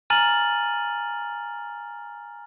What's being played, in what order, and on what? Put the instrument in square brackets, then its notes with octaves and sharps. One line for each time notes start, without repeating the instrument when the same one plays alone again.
[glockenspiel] G#5 A#5 F6 A6 D#7 F#7